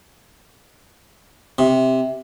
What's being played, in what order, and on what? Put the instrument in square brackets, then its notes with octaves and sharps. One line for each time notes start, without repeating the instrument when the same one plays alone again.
[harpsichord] C3